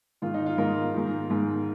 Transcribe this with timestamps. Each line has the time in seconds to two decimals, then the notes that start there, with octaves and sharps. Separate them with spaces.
0.22 G#2 D#3 F4
0.34 D#4
0.46 F4
0.58 G#2 D#3 F4 A#4
0.94 G#2 D#3
1.30 G#2 D#3